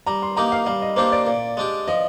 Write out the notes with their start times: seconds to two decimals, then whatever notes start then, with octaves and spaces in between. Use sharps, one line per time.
0.06 G3 A#5
0.22 C6
0.37 A#3 D#4 G4 A#5
0.52 F5
0.66 G3 F5
0.82 D#5
0.96 A#3 D4 G4 C5
1.12 D5
1.27 A#2
1.57 G#3 D4 G4
1.87 F3 D#5